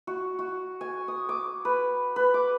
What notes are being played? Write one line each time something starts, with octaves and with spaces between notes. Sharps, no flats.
F#4
F#4
G#5
D#6
D6
B4
B4
D6